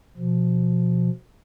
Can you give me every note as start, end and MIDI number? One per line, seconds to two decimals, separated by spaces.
0.17 1.10 47
0.17 1.10 53